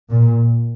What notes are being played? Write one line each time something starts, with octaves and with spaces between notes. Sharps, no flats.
A#2